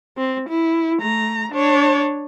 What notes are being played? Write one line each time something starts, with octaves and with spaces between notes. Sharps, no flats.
C4
E4
A3 A#5
D4 C#5